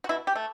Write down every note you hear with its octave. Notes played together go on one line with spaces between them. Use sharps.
F#4
B2 E4
G4
A3